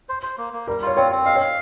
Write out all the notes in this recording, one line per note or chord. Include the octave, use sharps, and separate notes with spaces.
C5
C5
A#3
A#3
G3 A#4
F4 C#5
C4 C#5
C4
D#5 F5
C#5
F5